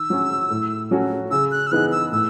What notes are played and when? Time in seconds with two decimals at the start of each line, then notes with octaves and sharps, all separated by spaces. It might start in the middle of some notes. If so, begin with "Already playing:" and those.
Already playing: D#3 E6
0.10 F#3 C#4
0.50 A2
0.91 F#3 C#4 F#4 A4
1.31 C#3 E6
1.51 F#6
1.67 E6
1.72 E3 B3 D#4 G#4 F#6
1.92 E6
2.12 A2 E6